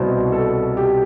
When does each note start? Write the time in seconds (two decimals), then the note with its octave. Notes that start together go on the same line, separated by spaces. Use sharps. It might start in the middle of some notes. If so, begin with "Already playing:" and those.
Already playing: C2 B2 C5
0.32 A4
0.77 G4